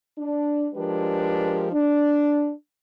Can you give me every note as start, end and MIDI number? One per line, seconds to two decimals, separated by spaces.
0.18 0.68 62
0.75 1.68 53
0.75 1.68 56
0.75 1.68 62
0.75 1.68 67
0.75 1.68 70
0.75 1.68 71
1.72 2.52 62